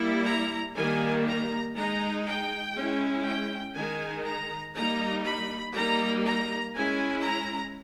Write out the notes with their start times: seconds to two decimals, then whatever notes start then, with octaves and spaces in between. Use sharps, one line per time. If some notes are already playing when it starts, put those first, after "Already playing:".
Already playing: G3 A#3 E4
0.25 A#5
0.75 D#3 G3 A#3 G#5
1.25 A#5
1.75 G#3 D#4 A#5
2.26 G5
2.75 G#3 C#4 E4
3.25 G5
3.75 D#3 G#3 D#4 G#5
4.26 A#5
4.76 G3 A#3 D#4 A#5
5.25 B5
5.75 G3 A#3 D#4 A#5
6.25 A#5
6.75 G#3 C#4 E4 G#5
7.24 A#5